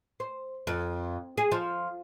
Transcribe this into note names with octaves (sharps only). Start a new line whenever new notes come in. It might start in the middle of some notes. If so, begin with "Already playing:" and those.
C5
F2
G#4
F3